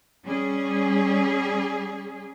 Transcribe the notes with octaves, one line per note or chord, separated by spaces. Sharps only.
G3 C#4 G#4